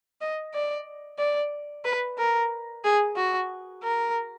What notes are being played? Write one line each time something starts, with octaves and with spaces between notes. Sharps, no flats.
D#5
D5
D5
B4
A#4
G#4
F#4
A#4